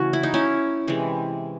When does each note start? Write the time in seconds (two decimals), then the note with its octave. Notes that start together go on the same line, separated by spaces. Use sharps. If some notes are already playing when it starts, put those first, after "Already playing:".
Already playing: C#3 E3 A3 C#4 F#4
0.13 E4
0.23 D#4
0.34 C#4 E4
0.88 C3 E3 G#3